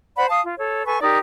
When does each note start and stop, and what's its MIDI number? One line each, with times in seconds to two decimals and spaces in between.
0.17 0.27 72
0.17 0.27 74
0.17 0.27 78
0.17 0.27 83
0.28 0.41 77
0.28 0.41 81
0.28 0.41 87
0.43 0.54 65
0.58 0.86 69
0.58 0.86 73
0.86 1.01 69
0.86 1.01 71
0.86 1.01 80
0.86 1.01 85
1.02 1.18 63
1.02 1.18 67
1.02 1.18 70
1.02 1.18 74